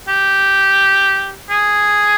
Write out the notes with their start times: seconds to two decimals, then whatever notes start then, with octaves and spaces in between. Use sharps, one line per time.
0.08 G4
1.50 G#4